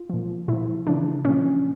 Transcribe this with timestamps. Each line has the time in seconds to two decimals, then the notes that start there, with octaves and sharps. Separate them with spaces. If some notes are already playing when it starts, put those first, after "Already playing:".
Already playing: F4
0.10 A#2 F3
0.48 A#2 F3 E4
0.87 C#3 E3 D4
1.25 A#2 F3 C#4